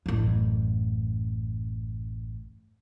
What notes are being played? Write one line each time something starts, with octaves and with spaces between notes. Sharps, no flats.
A1 F#2